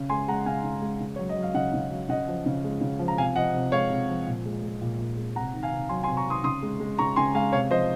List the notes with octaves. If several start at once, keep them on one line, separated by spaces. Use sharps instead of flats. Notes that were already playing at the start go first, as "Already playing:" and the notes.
Already playing: C#3
G#3 G#5 C6
G#3 F#5 A#5
C#3 F5 G#5
C#3
G#3
C#3
F#3 C#5
D#5
F#3
F5
C#3 D#5 F#5
C#3
F#3
C#3 D#5 F#5
F3
C#3
G#3
C#3
F3
A#5
C3 F5 G#5
F3 D#5 F#5
C3
G#3 C#5 F5
C3
F3
A#2
G#3
G#3
A#2
A#2
G#3
C3 F#5 A#5
D#3
F5 G#5
C3
F#3 G#5 C6
G#5 C6
C3
A#5 C#6
D#3 C6 D#6
C#3 C6 D#6
G#3
G#3
C#3 A#5 C#6
C#3 G#5 C6
G#3 F5 G#5
C3 C#5 F5
F3 C5 D#5